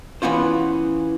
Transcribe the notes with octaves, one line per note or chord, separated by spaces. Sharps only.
E3 B3 C#4 F4 C5